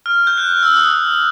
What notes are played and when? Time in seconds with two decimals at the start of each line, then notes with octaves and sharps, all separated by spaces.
0.06 F6
0.27 G6
0.37 F#6
0.63 E6
0.76 D#6